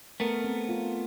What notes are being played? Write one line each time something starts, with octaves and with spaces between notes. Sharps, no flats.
A3 B3 A#4
C4
F4